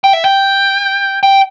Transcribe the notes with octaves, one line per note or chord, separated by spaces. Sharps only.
G5
E5
G5
G5